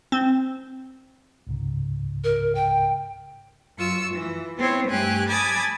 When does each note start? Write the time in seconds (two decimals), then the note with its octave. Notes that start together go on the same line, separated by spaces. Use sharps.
0.12 C4
1.47 C#2 G#2 C#3
2.24 A#4
2.55 G5
3.78 F#2 F4 C#6 E6
4.14 E3
4.58 B3 C4 E4 C5 C#5
4.87 G2 A3 G4 G#5 F#6
5.28 G#5 A5 B5 D6 D#6 G#6